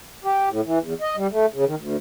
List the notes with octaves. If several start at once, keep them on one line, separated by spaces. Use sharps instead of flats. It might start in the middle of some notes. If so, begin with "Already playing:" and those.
G4
A2
E3
E2
D#5
G3
A3
C#3
D#3
D2